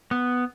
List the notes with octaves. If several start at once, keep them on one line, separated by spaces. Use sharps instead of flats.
B3